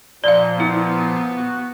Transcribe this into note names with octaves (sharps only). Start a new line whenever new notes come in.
A#2 F3 D5 F5
B3 E4
F#4